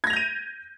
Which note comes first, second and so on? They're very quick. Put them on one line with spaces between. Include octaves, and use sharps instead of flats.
G#6 A#6 F7 G6 D#7